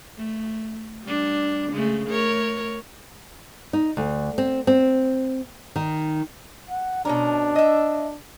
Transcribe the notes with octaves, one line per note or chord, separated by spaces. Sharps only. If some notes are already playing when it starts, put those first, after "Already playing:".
A3
G3 D4
C#3 G#3 A3
A3 A#4 C#5
D#4
D2
C4
C4
D#3
F#5
B2 C#4 D4 A#4
D#5 E5